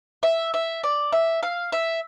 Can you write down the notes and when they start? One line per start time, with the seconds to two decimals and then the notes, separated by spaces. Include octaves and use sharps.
0.23 E5
0.54 E5
0.83 D5
1.12 E5
1.43 F5
1.72 E5